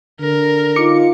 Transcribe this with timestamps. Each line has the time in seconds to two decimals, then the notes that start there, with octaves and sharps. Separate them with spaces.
0.20 D3 A#4
0.76 D#4 F4 D6 C#7